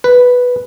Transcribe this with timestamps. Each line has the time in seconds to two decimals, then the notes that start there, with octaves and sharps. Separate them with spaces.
0.04 B4